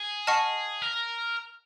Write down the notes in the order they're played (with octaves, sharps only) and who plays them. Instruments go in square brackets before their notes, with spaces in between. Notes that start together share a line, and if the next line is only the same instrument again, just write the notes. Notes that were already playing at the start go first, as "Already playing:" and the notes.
Already playing: [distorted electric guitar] G#4
[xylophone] D#5 F#5 A5 C#6 F6
[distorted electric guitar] A#4